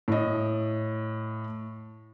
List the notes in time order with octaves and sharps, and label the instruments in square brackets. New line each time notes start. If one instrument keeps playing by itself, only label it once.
[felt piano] A2 D#5